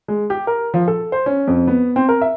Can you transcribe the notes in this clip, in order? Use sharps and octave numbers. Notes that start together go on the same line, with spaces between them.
G#3
G4
A#4
F3
A4
C5
C#4
F2
B3
C4
A#4
E5